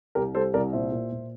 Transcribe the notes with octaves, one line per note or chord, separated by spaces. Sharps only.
C2 G4 A#4
G3 A4 C5
C2 A#4 D5
A#2 C5 E5
A#2
A#2